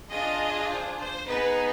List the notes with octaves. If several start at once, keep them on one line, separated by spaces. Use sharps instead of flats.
D4 F4 G#4 D#5
C5
C5
B3 D#4 G#4 B4